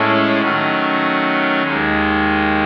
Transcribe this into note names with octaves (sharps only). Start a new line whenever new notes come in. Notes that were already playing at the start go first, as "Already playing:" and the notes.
Already playing: A2 G#3 C#4 E4 A4
D#3 F#3 A3 C#4
D#2 D#3 G#3